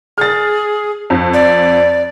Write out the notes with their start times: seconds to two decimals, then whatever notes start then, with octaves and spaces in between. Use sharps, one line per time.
0.18 G#4 F6 A6
1.10 F2
1.34 D5